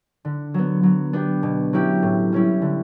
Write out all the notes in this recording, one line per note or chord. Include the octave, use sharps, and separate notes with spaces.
D3
F#3 B3
F#3
B3 D4 G4
B2
F#3 C#4 E4 G4
A2
G3 C#4 E4
D3